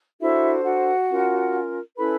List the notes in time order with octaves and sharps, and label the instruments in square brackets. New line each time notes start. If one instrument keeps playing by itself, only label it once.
[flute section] D4 E4 F#4 A4 C5 E5
F#4 F#5
C#4 F4 A#4
C#4 E4 A4 B4 B5